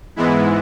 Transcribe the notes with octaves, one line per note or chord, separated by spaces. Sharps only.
G#2 E3 G#3 B3 E4